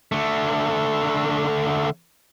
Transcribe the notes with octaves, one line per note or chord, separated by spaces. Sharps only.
D3 A3